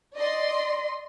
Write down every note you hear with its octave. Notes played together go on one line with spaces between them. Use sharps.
D5 D#5 C6